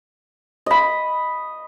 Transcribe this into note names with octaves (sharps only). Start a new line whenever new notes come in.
D#5 B5